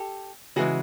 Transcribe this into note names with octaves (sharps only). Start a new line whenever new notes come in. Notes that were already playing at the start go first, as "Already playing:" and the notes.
Already playing: G4 A4
C#3 E3 G#3 F#4 G#4